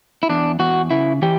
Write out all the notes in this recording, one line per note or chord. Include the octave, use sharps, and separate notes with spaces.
E4
E2 D4
E2 F#4
C#3 E4
E3 G4